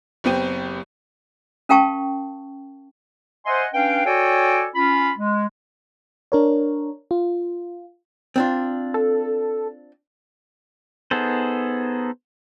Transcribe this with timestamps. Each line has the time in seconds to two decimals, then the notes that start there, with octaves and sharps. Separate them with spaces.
0.24 F#1 B3 C4 G4 D#7
1.69 C#4 A#4 F5 G5 A5 C#6
3.46 C5 D#5 E5 F#5 G#5 C6
3.74 C#4 D4 B4 F5 G5
4.06 F#4 A4 C#5 D5 G5 G#5
4.75 C#4 F4 B5
5.18 G#3
6.32 D4 A#4 C#5
7.11 F4
8.36 C4 D4 F4
8.94 A4
11.11 B3 D#4 G#4 A4 C5